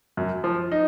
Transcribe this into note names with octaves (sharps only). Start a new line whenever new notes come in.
F#2
F3
D#4